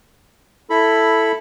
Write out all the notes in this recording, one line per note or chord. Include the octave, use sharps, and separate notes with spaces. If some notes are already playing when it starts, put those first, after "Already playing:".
E4 A4 B5